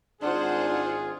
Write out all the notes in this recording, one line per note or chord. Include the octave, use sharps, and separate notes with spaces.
G#1 D4 F4 G#4 C5 F#5